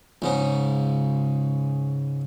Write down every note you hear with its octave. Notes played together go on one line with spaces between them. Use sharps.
C#2 G#2 C#3